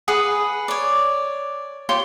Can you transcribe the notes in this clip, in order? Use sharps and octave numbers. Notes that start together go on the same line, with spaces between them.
G#4 B4 F#5 D#6
C#5 D5
F4 G4 C#5 C6